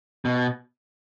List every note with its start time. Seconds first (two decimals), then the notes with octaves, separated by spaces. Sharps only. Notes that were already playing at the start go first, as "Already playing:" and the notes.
0.25 B2